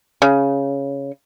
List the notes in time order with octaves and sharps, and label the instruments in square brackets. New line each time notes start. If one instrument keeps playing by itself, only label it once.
[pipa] C#3